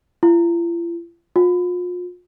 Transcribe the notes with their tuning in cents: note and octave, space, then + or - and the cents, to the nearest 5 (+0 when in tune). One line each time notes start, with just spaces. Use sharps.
F4 -45
F4 +40